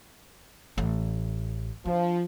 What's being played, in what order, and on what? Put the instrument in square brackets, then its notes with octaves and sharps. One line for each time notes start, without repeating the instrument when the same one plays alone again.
[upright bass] A1
[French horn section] F3 [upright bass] D4